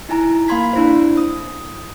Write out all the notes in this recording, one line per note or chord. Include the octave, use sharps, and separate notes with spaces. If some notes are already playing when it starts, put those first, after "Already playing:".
D#4 E4 G#5 A#5
A#3 F5 B5 C6 G#6 B6
D4 E4 C5
D#6